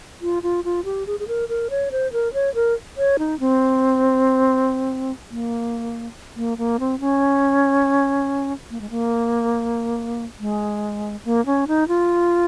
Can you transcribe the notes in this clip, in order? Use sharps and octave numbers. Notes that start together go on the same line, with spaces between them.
F4
F4
F4
G4
G#4
G#4
A#4
A#4
C#5
C5
A#4
C#5
A#4
C#5
D#4
C4
A#3
A#3
A#3
C4
C#4
A#3
G#3
A#3
G#3
A#3
C#4
D#4
F4